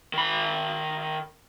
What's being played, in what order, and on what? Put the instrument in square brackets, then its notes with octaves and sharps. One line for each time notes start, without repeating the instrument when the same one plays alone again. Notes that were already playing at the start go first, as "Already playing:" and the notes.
[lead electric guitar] D#3 B5